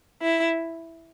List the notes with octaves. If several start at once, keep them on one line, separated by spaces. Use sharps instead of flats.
E4